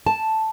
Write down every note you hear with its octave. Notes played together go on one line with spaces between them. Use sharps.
A5